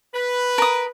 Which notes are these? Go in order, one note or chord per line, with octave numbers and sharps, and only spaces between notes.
B4
A#4 D#6